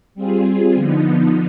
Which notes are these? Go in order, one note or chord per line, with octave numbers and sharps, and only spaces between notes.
G3 C4 F4 G#4
D3 F3 B3 D#4